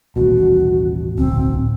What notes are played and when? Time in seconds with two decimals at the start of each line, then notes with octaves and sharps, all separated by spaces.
0.16 D#1 A1 B2 F#4
1.18 D1 B1 C4